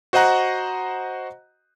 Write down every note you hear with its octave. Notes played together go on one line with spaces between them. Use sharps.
F#4 C5 D#5 F#5 A#5 F#6